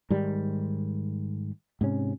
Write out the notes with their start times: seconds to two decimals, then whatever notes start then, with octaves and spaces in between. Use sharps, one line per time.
0.10 G#2 D#3 G3
1.81 G#2 C3 C#4